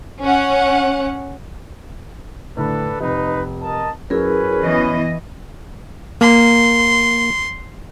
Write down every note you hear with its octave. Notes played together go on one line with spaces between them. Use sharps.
C#4 F#5
A2 D3 D4 A4 B4
F1 D#4 B4
A#4 D#5 A5
F#2 C#4 E4 G#4 A#4 B4
E3 B3 D#5
A#3 C6